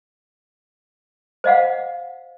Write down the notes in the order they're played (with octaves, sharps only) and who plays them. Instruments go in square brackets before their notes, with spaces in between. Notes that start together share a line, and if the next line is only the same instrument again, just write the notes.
[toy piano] C5 D#5 F5 F#5